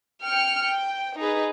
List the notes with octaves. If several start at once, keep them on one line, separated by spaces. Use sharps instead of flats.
G5 F6 C#7
G5
D#4 G#4 B4